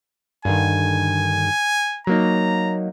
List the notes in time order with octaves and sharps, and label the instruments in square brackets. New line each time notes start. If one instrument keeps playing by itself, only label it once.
[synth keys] G2 D3 D#3 [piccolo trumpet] G#5
[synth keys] F#3 A#3 D#4 [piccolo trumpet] A#5